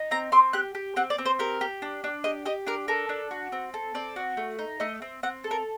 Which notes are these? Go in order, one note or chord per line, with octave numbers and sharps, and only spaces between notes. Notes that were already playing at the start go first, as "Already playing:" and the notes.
Already playing: D#4
C4 A#5
C4 C6
G4 F#6
G4
C4 F#5
D5
C4
C5
G4 A#4
G4
D4
D4
G4 D#5
G4 D#5
D4 A#4
A4 A#4
D4
F#4
C4
A4
C4 D5
F#4
A3
D#4
A3 D#5
C4
C4 F#5
A4
A#4